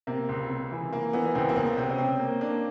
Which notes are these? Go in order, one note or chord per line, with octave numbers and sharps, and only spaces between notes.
C3 A#3
C#2
C3
E3
E3 A#3
E3 B3
B3
C#2 C4
A#3
C#2 B3
C3 C4
C#4
C3 C4
A#3
A#3 D4